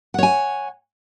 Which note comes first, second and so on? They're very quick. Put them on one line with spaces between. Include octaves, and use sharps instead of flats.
F#5 C#5 G#5